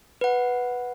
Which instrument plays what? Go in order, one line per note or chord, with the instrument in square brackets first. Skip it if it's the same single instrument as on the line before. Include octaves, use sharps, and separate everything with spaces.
[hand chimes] B4 F#5